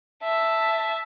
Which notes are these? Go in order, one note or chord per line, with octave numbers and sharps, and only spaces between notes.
E5 A5